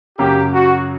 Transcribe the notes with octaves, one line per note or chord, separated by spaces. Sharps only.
F#2 C#3 F#3 A#3 G4
F#4